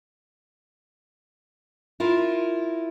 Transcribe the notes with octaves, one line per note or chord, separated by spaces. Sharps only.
E4 F4 A#4